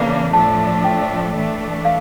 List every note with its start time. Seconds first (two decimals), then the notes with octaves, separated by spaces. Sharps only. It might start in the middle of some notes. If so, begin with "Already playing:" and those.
Already playing: E2 C#3 E3 A#3 D4
0.33 A2 F3 A3 D4 A5
0.84 G5
1.35 E3 A3 D4
1.85 F5